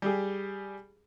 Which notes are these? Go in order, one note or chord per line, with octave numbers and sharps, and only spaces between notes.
G3 G4 G#4